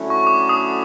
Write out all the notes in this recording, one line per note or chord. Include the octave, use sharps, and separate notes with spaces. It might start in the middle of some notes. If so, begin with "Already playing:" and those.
Already playing: D3 F#3 A3 C#4 E4
C#6
D6
D#6